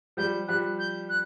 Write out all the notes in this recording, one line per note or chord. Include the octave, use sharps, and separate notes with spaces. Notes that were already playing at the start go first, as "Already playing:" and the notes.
F3 G3 G6
F3 G3 F#6
G6
F#6